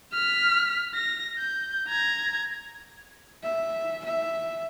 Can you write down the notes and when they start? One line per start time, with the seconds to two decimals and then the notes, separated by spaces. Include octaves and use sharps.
0.13 F6 B6
0.95 A#6
1.39 G6
1.88 A#5 G#6
3.43 E5
4.05 E5